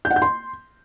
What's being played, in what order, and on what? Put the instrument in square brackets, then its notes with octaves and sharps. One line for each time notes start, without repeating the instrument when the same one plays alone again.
[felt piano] G6
F#5
G6
C6